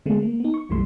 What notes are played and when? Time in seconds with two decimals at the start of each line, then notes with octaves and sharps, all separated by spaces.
0.06 D3 G#3 A3 B3
0.23 A#3
0.40 B3 D#4
0.54 C#6
0.69 B1 F#2 E3 G3 A3 C6